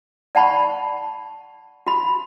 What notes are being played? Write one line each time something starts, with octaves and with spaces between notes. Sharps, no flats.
D5 F#5 A5 B5 C#6
F#4 B5